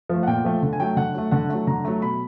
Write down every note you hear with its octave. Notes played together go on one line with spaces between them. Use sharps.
F3 A3
F#5
A#2 G5
F3 A3
D3
G#5
F#3 A3 G5
D3 F#5
F#3 A3
D3 F#5
F#3 A3
D3 A#5
F#3 A3
B2 B5